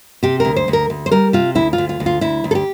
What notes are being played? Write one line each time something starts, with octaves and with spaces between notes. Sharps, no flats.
C3 G4
D2 A#4
C5
D2
A#4
D2
C5
G3 A#4
C3 F4
D2 E4
F4
D2
F4
D2
F4
D2 E4
D2
A4
G4